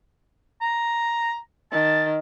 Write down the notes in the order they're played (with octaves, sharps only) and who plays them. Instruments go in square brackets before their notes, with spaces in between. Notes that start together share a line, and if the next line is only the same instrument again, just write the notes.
[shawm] A#5
[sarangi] D#3 [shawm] A5